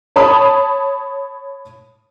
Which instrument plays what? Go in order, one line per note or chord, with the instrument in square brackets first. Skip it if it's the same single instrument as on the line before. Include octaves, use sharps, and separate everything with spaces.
[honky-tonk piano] C#5 A5 B5 D#6